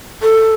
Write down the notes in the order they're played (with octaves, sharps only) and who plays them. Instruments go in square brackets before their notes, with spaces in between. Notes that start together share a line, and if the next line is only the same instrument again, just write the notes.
[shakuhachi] A4